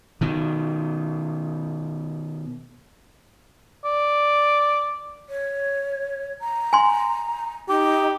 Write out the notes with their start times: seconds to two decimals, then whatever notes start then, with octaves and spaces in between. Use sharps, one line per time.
0.21 B2 D#3
3.84 D5
5.28 C#5
6.40 A#5
6.73 G#5 C6
7.69 D#4 G4